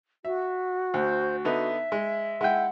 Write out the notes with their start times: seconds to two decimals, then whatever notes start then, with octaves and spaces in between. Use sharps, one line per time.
0.25 F#4 E5
0.94 D2 C5
1.45 D3 B3 D#4 E5
1.92 G#3
2.41 G#3 E4 F#5 G5